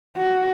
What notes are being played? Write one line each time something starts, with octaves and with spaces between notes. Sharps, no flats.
F#4